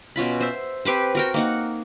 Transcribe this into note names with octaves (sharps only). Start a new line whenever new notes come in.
B2 C#4 F4 B5
C5 E5
C4 G4 B4 C5
F#4 A#4 G5
A#3 D#4 F#5